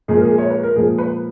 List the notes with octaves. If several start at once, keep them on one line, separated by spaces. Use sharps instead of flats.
A#2 F3 G#3 G#4
A#4
G#4
C#5
B4
A#4
A#2 F3 G#3 G#4
B4